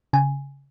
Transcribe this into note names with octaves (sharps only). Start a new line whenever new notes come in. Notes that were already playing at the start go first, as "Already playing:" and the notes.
C#3 G#5